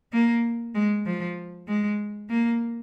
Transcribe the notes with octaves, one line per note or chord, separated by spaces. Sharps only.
A#3
G#3
F3
G#3
A#3